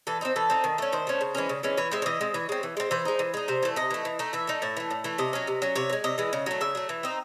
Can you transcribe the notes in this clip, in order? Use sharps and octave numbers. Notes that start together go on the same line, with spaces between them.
E3 A4
C4 D#4 C5
E3 A4
C4 D#4
D#3
A3 C#4
D#3 C5
A3 C#4
C#3
E3 G#3 C#4
C#3
E3 G#3 C#4
E3 C#5
G#3 C4 E5
C#5
E3 D#5
G#3 C4
E3 C#5
G#3 C4
E3
G#3 C4
E3 C5
G#3 D#4
E3
G#3 D#4
C3 C5
E3 A3
C3 D#5
E3 A3
E3
A3 D#4
E3 E5
A3 D#4
A2 E5
E3 A3
A2
E3 A3
C3 D#5
F#3 C#4
C3
F#3 C#4
C3 C#5
E3
G#3
C3 D#5
E3 G#3
C#3
F#3 A3
C#3 E5
F#3 A3
E3
C4 D#4